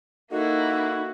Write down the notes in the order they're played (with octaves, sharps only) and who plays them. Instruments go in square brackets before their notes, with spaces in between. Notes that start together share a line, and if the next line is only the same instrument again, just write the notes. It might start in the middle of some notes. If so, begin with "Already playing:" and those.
[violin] A#3 E4 [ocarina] D#4 [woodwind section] F#4 [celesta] A4 A#4 D#5